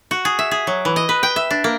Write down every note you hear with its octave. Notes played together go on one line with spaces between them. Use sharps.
F#4
G#4
E5
G#4
F#3
E3
D#5
B4
G5
E5
D4
A#3